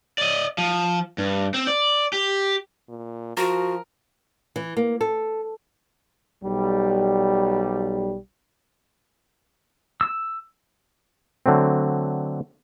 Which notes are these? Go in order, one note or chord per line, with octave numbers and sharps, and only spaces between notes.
D5 D#5
F3
G2
C4
D5
G4
A#2
F3 F#4 A#4
E3
A#3
A4
B1 G3
E6
D3 F#3 A3 C4